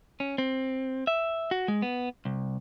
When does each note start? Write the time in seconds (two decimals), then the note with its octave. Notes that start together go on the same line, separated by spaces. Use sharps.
0.20 C#4
0.38 C4
1.07 E5
1.51 F#4
1.68 G#3
1.82 B3
2.25 C2